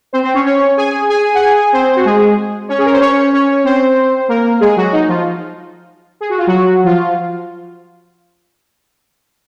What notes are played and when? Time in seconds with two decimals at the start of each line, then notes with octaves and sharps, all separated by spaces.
0.13 C4 C5
0.23 C4 C5
0.34 C#4 C#5
0.44 C#4 C#5
0.77 G#4 G#5
1.09 G#4 G#5
1.34 F#5
1.41 G#4 G#5
1.73 C4 C5
1.96 F#4
2.05 G#3 G#4
2.69 C#4 C#5
2.78 G#4
2.85 A#4
2.93 C5
3.01 C#4 C#5
3.33 C#4 C#5
3.64 C4 C5
4.28 A#3 A#4
4.60 G#3 G#4
4.77 F#3 F#4
4.93 D#4
5.08 F3 F4
6.21 G#4
6.30 F#4
6.38 F4
6.47 F#3 F#4
6.84 F3 F4